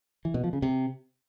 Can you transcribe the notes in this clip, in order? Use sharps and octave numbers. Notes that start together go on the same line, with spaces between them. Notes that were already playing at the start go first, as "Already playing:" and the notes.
E3
B2
F3
C#3
C3